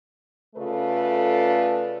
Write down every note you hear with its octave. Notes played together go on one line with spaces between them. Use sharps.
C#3 A3 F4 A4 B4 D5